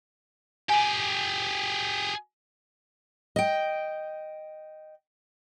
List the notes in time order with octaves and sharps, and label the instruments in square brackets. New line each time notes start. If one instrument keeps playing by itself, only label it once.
[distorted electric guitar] G4 G#4 [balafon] G#5
[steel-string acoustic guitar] D#5 G5